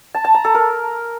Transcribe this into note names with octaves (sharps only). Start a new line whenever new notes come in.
A5
A5
A#5
A4
A#4